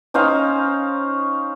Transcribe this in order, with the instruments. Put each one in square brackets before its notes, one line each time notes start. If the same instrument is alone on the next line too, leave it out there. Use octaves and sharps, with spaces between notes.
[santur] C#4 D#4 C5 F5